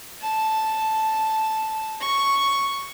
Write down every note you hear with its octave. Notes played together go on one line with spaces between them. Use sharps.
A5
C#6